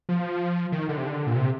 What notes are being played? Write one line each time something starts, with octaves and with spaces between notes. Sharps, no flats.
F3
D#3
D3
C3
D3
A#2
C3